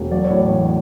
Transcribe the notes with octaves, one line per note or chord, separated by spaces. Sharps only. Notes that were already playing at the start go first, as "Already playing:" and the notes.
Already playing: E1
F#3 D5
C#5
A2
C#5
A1 D5